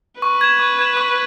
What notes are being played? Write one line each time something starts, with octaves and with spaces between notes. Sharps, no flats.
B4 C#6
G#6 E7
C#6
G#6 E7
C#6